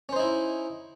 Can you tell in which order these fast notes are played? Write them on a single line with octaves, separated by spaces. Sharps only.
C#4 C5 D#4 E4